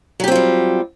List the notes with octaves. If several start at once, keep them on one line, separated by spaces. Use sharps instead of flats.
F#3 G3 C4 F4 G4